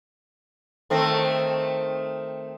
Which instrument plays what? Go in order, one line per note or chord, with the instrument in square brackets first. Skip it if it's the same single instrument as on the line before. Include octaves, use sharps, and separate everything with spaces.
[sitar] D#3 A3 C4